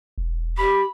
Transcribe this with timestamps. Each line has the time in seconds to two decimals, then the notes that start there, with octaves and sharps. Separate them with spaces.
0.18 E1
0.58 G4 B5